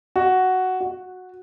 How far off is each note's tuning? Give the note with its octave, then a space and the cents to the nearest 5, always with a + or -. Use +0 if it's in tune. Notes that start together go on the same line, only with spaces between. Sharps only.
F#4 +5
F#4 -10